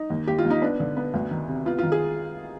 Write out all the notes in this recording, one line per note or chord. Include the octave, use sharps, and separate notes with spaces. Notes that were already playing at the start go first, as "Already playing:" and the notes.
Already playing: D#4
D#2
D#2 G4
F4
D#2
D#4
B3 D4
D3
B3
D2
D#3
C3
B3 F4
D#3 F4
G#4